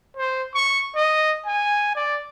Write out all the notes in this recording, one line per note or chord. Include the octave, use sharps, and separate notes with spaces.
C5
C#6
D#5
G#5
D5